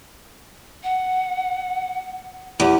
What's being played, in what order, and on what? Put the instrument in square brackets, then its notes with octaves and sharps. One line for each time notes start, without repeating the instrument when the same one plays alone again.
[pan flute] F#5
[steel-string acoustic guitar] E2 [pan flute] G4